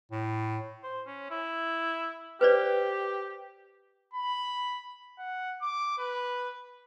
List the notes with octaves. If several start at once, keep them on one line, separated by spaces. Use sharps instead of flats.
A2
C5
C#4
E4
G4 B4 C5 D5
B5
F#5
D6
B4